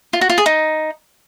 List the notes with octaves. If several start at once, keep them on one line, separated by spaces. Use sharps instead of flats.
F4
F#4
F4
G#4
D#4